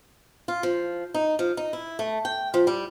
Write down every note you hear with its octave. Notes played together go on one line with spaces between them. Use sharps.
F4
F3
D#4
F3
D#4
E4
A3
G5
F3
G3